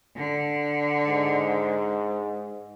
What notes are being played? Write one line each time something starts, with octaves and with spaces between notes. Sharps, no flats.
D3
G#2